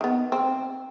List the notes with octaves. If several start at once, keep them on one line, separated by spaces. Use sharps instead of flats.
D#3 B3
C4